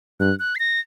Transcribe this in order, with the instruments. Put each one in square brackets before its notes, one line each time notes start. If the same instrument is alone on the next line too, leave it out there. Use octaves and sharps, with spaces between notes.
[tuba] G2 [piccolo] F#6
[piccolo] F#6
C7
A#6